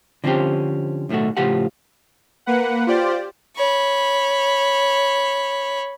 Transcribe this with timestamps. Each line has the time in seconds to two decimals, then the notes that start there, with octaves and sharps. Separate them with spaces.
0.24 D3 F3 C4 C#4 G4
1.09 B1 A2 D#3 A3 F#4
1.37 A2 C#3 F3 F4 G4 F#5
2.46 A#3 B4 F#5
2.87 F4 G4 C5 D5
3.56 C#5 B5